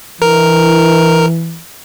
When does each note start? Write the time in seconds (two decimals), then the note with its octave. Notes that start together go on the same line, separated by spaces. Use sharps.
0.22 E3 A#4